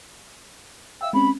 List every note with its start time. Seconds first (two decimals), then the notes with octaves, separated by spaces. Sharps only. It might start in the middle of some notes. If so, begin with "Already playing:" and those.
1.01 E5 F5 G5 E6
1.13 G#3 C4 C#4 B5